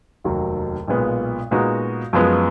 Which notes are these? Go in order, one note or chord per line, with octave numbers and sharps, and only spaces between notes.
F1 D#2 D#3 F#3
B1 A#2 G#3 B3 F4
A#2 G#3 B3 D#4 F#4
F#2 F3 G#3 B3